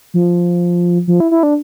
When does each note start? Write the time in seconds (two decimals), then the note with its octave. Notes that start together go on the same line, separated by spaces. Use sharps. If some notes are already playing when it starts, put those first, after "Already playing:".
0.14 F3
1.07 F3
1.20 E4
1.31 E4
1.43 D4